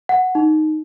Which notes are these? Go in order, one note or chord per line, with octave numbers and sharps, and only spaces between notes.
F#5
D#4